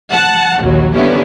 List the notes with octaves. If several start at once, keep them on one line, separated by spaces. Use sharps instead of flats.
F#5 A5
A#1 D#2 F#3
D3 G3 A#3 B3 C#4 E4